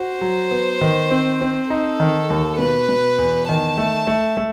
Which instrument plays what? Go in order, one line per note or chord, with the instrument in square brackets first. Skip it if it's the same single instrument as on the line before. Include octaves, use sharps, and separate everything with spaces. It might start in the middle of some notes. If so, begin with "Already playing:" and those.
Already playing: [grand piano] F#4 [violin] C5
[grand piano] F#3
B3
D#3
C4
C4
[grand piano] D#4 [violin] A4
[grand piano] D#3
D#2
[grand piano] B2 [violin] B4
[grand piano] B2
E2
[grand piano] D#3 [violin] A5
[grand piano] A3
A3
A3